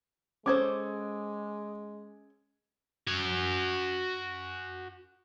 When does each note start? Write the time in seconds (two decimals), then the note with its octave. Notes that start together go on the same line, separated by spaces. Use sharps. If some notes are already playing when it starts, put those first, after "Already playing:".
0.46 G#3 C#4 A4 C5 D6 D#6 G#6
3.07 F#4 G#5